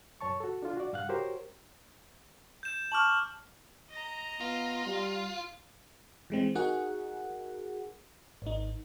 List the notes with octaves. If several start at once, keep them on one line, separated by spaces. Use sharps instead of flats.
F#2 C#5 A5 C#6
F#4 A4
D4 F4
F#4 D5
G2 F5 F#5 F#6
F#4 G4 A#4 C5 C#5
G6 E7
A5 C#6 D6 F6 E7 F#7
D#5 A#5
B3 F4
G3
E3 G#3 C4
D#4 F#4 G#4 A#4 F#5
G#1 D#4